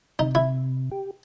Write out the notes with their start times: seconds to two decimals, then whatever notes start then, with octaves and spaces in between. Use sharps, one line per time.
0.19 C3 D#4
0.35 E4
0.92 G4